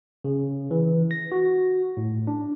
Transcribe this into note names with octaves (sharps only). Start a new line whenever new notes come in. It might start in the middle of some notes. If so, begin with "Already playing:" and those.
C#3
E3
A#6
F#4
A2
D4